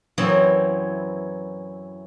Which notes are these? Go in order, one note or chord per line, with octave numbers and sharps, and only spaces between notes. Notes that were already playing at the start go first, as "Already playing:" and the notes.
F#2 E3 F#3 B3 C4 E4